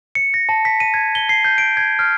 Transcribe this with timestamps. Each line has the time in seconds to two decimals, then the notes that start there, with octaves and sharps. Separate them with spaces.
0.15 C#7
0.34 A#6
0.49 A5
0.65 B6
0.80 D#7
0.94 G#6
1.15 G7
1.29 C7
1.45 G6
1.58 D7
1.77 G#6
1.99 F6